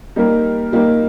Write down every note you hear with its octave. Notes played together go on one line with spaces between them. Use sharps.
G3 A#3 D#4 G4 A#4
G3 A#3 D#4 G4 A#4